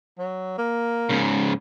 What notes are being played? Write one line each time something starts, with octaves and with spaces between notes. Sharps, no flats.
F#3
A#3
G#2 C#3